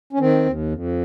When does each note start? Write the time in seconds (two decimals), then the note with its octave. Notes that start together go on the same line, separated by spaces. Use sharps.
0.13 C#4
0.20 D#3 C4
0.46 D#2
0.72 F2